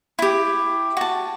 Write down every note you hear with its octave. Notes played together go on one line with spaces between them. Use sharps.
E4 G4
F#4 A5